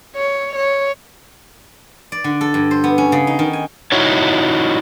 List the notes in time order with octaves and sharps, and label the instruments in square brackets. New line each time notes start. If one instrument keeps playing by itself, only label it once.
[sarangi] C#5
C#5
[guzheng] D5
D3
A4
G2
C5
B3
C#4
C#3
D#4
D#3
G#5
[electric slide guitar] D#4 E4 F#4 C#5